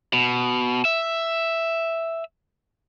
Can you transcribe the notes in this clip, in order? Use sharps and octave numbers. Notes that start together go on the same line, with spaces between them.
B2
E5